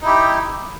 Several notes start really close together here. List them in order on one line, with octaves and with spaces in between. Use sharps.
D#4 E4 G4